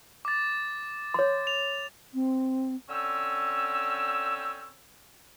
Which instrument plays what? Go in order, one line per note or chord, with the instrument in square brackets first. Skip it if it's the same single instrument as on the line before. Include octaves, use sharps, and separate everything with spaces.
[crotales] D6 A6
[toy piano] C#5 C6
[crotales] F7
[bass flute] C4
[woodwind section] D3 C4 C#4 E6